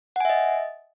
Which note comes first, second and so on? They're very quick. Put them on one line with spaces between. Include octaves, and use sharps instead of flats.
F#5 G#5 E5 D#5